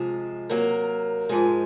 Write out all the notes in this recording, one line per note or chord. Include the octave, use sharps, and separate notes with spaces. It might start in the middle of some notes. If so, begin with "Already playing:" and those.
Already playing: C3 F3 G#3
C3 F#3 A#3 A#4
G#2 F3 G#3